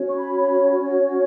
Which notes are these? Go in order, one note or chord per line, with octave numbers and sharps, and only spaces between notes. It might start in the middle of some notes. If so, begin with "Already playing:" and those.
Already playing: C#4 F#4 C#5
C#6
B5
B5